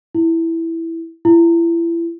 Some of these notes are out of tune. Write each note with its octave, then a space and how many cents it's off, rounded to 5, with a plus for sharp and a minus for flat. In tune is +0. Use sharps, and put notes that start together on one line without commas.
E4 +0
E4 +30